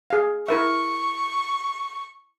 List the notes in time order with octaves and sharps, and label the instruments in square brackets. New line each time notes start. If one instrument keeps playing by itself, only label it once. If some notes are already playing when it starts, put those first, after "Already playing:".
[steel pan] G#4 F5
[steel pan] E4 A#4 E5 [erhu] C#6